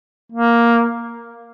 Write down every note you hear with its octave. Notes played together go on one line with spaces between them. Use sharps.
A#3